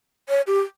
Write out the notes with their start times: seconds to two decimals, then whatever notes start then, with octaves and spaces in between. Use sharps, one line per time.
0.29 C#5
0.47 G4